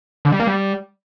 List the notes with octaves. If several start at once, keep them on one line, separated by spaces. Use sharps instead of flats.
D3
G3
A#3
G3